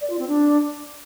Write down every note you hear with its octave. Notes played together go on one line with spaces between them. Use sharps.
D5
F4
C4
D4